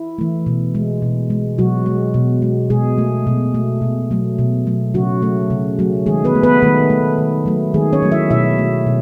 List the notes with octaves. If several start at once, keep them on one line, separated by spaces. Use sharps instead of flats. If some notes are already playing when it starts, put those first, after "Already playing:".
Already playing: E4
E3 A3
B2
G#3
B2
G#3
B2 F#3 F#4
G#3
B2
G#3
B2 G#3 G#4
A3
B2
A3
B2
F#3 A3
B2
F#3 A3
C#3 F#3 F#4
F#3 A3
C#3
F#3 A3
D#3 G#3 G#4
B3 B4
A3
B3 B4
D#3 A3 A4
A3
D#3
F#3 A3
D#3 G#3 G#4
C#4 C#5
F#3 A3
E4 E5
B2 E4 E5
A3
B2